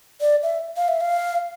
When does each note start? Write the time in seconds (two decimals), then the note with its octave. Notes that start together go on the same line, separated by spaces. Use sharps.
0.21 D5
0.43 E5
0.77 F5
0.88 E5
1.01 F5